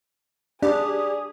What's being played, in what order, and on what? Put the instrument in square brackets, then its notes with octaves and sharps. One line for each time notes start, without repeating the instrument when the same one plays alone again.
[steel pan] D4 [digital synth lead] G4 [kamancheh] G#4 [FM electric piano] D5